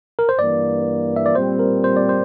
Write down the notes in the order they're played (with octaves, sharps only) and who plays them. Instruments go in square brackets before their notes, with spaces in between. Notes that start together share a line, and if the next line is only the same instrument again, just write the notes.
[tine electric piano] A#4
C5
[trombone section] G2 E3 A#3 [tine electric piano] D5
[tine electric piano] E5
D5
[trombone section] A#2 G3 C4 [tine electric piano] C5
[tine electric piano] A#4
C5
D5
C5